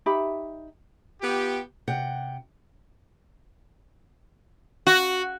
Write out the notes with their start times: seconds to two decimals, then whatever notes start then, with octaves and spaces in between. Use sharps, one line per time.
0.06 D#4 G4 E5 B5
1.21 B3 F4 G4
1.88 C3 F#5 G5
4.87 F#4